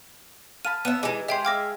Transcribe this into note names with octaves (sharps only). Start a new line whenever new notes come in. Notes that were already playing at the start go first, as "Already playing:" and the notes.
F5 A5 B5 D#7
B3 E5 D#7
E3 G#3 D#4 D6
G#3 G4 C5 E5 G5 C7
E5 F5 G5 D6 A#6